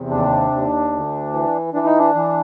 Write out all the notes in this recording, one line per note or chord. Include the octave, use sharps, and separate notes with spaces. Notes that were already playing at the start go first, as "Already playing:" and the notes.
Already playing: E2 C3
D#2 D4
D#2
D2
E3
E3 D4
D#4
D4
E3